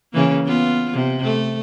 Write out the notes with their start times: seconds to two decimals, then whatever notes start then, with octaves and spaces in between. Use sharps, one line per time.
0.13 C#3 E3 A#3
0.45 B3 F4
0.93 C3
1.24 A3